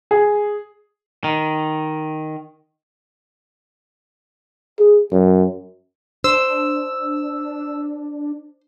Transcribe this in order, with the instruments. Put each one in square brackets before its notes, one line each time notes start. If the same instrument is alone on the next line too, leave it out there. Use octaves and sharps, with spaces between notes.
[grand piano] G#4
[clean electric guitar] D#3
[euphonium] G#4
F#2
[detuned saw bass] D4 [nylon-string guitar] C5 [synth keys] E6